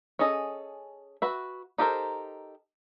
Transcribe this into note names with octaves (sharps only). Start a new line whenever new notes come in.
C#4 G#4 A4 D#5
F#4 B4 E5
D#4 G4 A4 A#4 C5